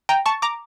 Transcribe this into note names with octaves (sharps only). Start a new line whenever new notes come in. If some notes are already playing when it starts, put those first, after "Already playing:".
G5 A#5
A5 C#6
A#5 D6